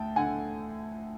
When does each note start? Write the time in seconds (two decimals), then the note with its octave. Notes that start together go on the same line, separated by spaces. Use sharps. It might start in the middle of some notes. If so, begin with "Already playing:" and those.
Already playing: D2 G5 A5
0.16 D2 D3 F#5 G#5